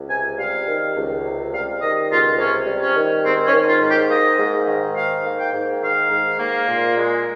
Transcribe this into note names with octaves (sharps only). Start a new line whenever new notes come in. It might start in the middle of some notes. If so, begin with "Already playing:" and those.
Already playing: C#2
C3 G#5
G3 F5
D#3
C#2
C3
G3 F5
D#3 D#5
C#2 F4
C3 C#4
G3
C#4
D#3
G#2 C4
C#4
D#3
F4
G#2
G4
A#3 D#5
G#2
D#3
G#2 F5
A#3
G5
G#2
D#3 F5
G#2
A#3
A#2
G#3